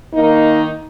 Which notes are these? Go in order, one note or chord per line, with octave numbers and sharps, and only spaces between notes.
D#3 A#3 D#4